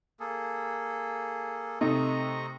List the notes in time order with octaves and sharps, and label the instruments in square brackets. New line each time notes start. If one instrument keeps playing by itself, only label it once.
[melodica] A#3 G#4 A4
[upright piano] C3 A3 D#4 [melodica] D#5 A#5 C#6